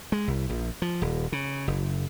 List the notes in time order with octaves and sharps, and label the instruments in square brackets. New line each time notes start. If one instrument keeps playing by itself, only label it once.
[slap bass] G#3
C2
A#1
F3
D#1
C#3
F#1